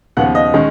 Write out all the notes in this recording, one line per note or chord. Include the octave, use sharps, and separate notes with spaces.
D#2 C#3 F3 B3 F#5
D#5
D#3 G#3 C#4